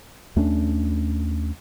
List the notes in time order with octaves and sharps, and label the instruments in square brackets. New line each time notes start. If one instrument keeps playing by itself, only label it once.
[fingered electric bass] D#2 A3 C#4 D4